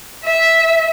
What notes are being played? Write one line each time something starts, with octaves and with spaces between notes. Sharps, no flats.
E5